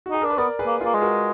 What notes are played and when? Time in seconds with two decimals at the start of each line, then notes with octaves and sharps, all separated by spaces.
0.06 F#4
0.10 D#4 G#4
0.22 D4 A#4
0.30 B4
0.38 B3 A#4 D5
0.59 G#4 B4
0.67 A#3
0.81 A#3 F4 G#4
0.94 G#3
1.02 F#4 A#4